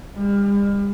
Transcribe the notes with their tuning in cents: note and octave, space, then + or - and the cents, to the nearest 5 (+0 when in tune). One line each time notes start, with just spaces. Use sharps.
G3 +40